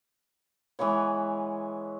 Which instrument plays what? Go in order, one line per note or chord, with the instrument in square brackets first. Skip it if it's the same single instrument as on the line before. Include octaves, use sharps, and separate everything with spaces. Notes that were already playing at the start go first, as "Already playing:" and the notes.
[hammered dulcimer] E3 G#3 B3 C#5